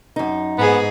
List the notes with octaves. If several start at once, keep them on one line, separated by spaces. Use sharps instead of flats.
F#2 D#4
G#2 B3 G#4